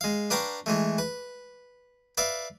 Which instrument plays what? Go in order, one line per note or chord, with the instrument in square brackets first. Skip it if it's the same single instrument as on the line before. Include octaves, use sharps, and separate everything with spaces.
[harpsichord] G#3 F5
D4 B4 F5 G5 A#5 C#6
E3 G#3 A3
B4
B4 D5 E5 F5